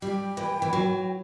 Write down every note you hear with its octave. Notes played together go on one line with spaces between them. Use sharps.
G3 G5
E3
E3
F#3